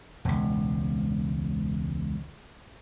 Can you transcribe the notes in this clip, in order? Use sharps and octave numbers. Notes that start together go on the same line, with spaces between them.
E1 C#2